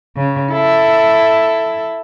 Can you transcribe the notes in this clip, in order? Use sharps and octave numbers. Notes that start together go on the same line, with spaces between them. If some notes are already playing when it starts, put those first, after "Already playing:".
C#3
E4 A4